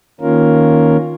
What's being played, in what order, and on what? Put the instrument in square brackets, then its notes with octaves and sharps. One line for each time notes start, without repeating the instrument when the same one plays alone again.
[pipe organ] D#3 A#3 C#4 F4 A#4